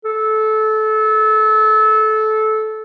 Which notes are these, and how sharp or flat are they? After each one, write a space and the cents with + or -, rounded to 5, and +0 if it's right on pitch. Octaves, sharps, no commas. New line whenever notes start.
A4 -20